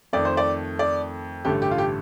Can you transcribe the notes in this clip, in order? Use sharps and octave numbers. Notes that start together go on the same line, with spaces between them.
F2 D#3 A3 D5
C5
D5
D5
A1 G2 D3 A3 G4
G4
F4
G4